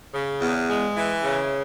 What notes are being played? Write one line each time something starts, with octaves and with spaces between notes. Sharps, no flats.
C#3
E2
G#3
E3
C#3